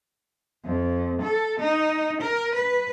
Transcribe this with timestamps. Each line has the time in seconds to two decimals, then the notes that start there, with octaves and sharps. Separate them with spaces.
0.65 F2
1.22 A4
1.60 D#4
2.21 A#4
2.55 B4